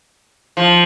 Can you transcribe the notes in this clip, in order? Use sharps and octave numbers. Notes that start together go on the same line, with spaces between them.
F3